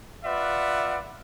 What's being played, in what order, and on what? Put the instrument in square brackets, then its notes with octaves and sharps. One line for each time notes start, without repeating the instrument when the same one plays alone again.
[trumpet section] F4 B4 D5 E5 F#5